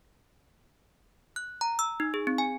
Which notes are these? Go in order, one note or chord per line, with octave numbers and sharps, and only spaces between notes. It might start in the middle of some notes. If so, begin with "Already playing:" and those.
F#6
A#5
E6
D#4
G#4
C4
G#5